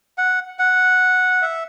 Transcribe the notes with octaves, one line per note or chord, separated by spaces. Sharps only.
F#5
F#5
E5